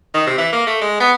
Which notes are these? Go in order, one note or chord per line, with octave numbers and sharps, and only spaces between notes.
D#3
C3
E3
A#3
A3
G#3
B3